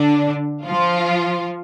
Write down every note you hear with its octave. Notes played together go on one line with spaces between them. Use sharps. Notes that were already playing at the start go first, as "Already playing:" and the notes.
Already playing: D3 D4
F3 F4